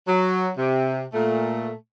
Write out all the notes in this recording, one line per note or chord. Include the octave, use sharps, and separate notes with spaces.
F#3
C3
A#2 A3